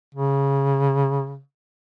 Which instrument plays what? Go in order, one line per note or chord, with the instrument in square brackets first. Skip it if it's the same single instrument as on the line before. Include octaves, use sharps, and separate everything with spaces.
[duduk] C#3